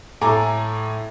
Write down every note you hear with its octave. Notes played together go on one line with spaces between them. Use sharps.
A2 A4 G#5 A#5 D6